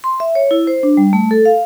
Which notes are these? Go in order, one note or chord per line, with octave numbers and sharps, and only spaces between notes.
C6
E5
C#5
E4
C5
D4
G3
A3
A4
F5